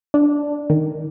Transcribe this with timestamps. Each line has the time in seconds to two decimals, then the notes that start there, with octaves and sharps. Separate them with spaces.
0.14 D4
0.70 D#3